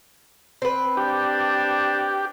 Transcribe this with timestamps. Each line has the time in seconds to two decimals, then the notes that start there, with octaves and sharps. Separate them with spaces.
0.62 C4 B4
0.97 D4 G4